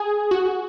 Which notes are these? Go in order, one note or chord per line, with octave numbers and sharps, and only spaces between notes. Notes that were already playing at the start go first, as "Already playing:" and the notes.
Already playing: G#4
F#4